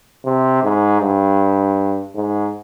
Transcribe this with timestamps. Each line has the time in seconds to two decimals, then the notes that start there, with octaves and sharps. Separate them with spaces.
0.25 C3
0.63 G#2
1.01 G2
2.15 G#2